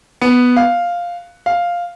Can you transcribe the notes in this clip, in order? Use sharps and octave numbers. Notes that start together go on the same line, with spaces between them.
B3
F5
F5